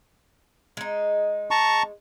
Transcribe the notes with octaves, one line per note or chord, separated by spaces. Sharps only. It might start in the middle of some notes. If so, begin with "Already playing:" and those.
G#3 D#4
A5 A#5 C#6